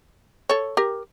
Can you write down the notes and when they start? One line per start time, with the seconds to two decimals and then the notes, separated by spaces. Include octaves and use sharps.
0.49 A4 C#5
0.77 G4 A#4